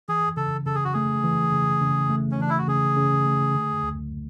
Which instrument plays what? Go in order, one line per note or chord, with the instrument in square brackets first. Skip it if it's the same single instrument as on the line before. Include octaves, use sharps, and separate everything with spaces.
[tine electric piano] E3 [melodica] G#4
[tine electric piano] C#3 [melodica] A4
[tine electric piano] C#3 [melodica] A4
[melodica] G#4
F#4
[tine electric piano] A3 [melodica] G#4
[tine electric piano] E3
C#3
C#3
A3
[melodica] C#4
[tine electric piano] E3 [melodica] D4
[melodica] E4
F#4
[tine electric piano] C#3 [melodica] G#4
[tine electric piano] C#3
A3
D3
D2